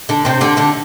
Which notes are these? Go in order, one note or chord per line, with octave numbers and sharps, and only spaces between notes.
D3 D4
C3 C4
D3 D4
D3 D4